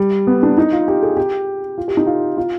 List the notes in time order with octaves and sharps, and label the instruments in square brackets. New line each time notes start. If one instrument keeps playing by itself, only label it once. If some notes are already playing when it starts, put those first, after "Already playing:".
Already playing: [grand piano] G3
B3
D4
D#4
F4
G4
G#4
G4
F4
G4
D#4
F4
F4